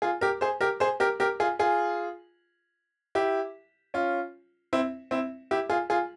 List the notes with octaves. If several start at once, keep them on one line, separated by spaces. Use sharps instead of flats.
F4 G#4
G4 A#4
G#4 C5
G4 A#4
G#4 C5
G4 A#4
G4 A#4
F4 G#4
F4 G#4
E4 G4
C#4 F4
C4 E4
C4 E4
E4 G4
F4 G#4
F4 G#4